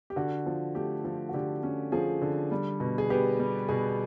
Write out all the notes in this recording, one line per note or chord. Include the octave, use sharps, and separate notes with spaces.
G4
D3 F#4
F3
A3 G4
F3
F#4
D3 G4
C#4
F3 G#4
D3
G3
B2
G#4
B3 G4
G3
B2 G#4